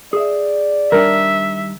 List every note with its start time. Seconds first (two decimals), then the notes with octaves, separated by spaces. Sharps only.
0.13 G#4 D5 E5
0.92 D#3 G3 D4 A#4 E5